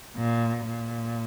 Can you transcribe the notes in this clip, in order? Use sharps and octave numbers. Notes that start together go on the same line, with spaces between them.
A#2
A#2